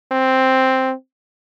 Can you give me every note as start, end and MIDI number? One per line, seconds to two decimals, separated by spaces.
0.12 0.93 60